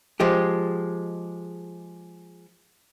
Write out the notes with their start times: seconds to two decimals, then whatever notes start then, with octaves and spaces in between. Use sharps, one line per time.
0.20 F3 G#3 G4